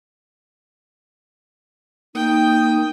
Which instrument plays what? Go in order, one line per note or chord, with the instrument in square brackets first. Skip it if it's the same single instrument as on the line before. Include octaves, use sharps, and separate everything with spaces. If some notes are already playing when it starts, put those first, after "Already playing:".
[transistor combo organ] A#3 D#6 [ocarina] D#4 [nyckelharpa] G5